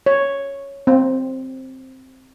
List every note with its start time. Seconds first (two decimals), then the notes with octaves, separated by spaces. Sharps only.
0.06 C#5
0.87 C4